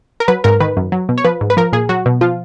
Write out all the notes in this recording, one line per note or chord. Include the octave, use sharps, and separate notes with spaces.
A#4
F#3 B4
G#2 A#4
D#3 B4
F#2
F#3
B2
C#5
F3 B4
G#2
B4
F3 A#4
A#2 G#4
F#3 F#4
B2
F3 F4